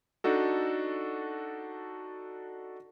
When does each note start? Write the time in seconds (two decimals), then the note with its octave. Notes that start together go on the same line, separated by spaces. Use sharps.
0.24 D4 D#4 F#4 A4